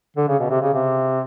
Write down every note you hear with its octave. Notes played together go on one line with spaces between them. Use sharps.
D3
C#3
B2
C3
C#3
C3